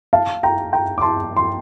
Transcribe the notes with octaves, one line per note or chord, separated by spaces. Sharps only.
F5 A5
G5 A#5
G5 A#5
D6
A5 C6
C6